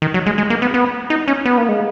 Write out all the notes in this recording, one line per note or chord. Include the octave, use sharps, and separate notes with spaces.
D#3
F#3
G#3
G#3
A#3
B3
B3
D#4
C#4
B3
A#3
G#3